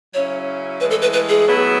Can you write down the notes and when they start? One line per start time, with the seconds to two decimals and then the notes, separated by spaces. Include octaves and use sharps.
0.14 C#3 F#3 C#4 E4 C#5
0.80 A2 E3 G#3 B4
0.90 A4
1.02 B4
1.13 B4
1.29 G#4
1.46 A2 F#3 B3 E4